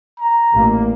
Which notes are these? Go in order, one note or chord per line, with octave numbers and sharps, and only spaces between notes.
A#5
A1 A#3